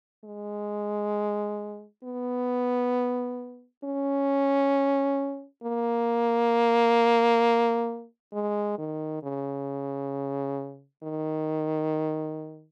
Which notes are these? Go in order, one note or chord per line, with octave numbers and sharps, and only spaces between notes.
G#3
B3
C#4
A#3
G#3
D#3
C#3
D#3